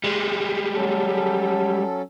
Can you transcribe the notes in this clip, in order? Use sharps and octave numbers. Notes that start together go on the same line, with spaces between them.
G3 G#3
F#3 C#4 A4